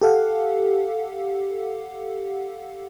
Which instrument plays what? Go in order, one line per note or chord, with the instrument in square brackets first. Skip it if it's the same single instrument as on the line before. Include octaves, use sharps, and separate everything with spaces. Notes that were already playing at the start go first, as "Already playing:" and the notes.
[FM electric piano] G4 A4 F5 F#5